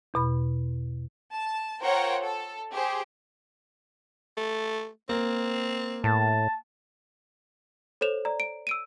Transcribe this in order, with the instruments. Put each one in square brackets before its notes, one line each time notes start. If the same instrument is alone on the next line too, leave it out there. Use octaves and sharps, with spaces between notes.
[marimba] E2 B2 B5
[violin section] A5
F4 A#4 C5 C#5 F#5 G5
A4
G4 G#4 C5
[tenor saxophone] A3
[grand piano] A#3 [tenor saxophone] C4
[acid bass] A2 [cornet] A5
[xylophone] A4 C5 C#5 E7 F7
D5 A#5
D7
E6 D7 D#7